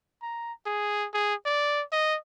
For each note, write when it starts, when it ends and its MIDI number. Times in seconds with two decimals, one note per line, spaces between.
0.22 0.52 82
0.66 1.07 68
1.14 1.34 68
1.46 1.82 74
1.92 2.16 75